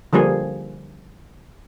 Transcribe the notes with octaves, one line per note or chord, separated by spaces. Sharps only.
D3 F3 G3 A#3 G#4